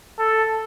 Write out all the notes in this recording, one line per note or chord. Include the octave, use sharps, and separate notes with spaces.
A4